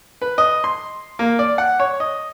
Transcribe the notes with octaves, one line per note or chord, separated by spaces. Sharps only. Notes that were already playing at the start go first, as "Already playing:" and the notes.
B4
D#5
C6
A#3
D5
F#5
C#5
D#5